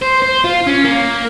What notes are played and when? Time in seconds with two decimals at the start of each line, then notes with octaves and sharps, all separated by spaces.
0.02 C5
0.22 C5
0.44 F4
0.67 C#4
0.85 A#3